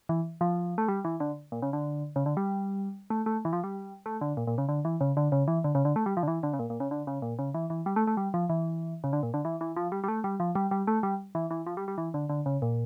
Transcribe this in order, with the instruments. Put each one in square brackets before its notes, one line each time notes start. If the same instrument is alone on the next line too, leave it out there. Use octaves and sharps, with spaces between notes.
[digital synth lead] E3
F3
A3
G3
E3
D3
A#2
C#3
D3
C#3
D3
G3
A3
A3
E3
F3
G3
A3
D3
A#2
A#2
C#3
D3
E3
C#3
D3
C#3
E3
D3
C#3
D3
A3
G3
F3
D3
E3
D3
C#3
A#2
A#2
C#3
D3
C#3
A#2
C#3
E3
E3
G3
A3
A3
G3
F3
E3
C#3
D3
A#2
D3
E3
E3
F3
G3
G3
A3
G3
F3
G3
G3
A3
G3
E3
E3
F3
G3
G3
E3
D3
D3
C#3
A#2